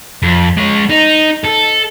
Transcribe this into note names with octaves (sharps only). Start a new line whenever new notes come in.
F2
G#3 C#5
D#4
A4